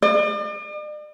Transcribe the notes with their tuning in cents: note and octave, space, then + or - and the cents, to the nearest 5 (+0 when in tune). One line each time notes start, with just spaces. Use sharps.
D5 +45